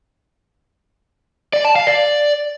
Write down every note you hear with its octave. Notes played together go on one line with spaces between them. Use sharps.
D5
A5
F5
D5